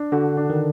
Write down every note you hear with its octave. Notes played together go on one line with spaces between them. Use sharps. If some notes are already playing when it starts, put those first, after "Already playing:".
Already playing: D4
D3 F#4
D4
D#3